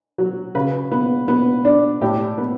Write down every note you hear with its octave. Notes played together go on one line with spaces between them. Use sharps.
F#3
C#3 B4
B3
B3
D4
A2 G4
B3